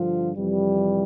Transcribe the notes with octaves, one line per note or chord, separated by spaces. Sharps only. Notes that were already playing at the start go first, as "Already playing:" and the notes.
Already playing: G2 D3 F3 F4
F2 C3 E3 G3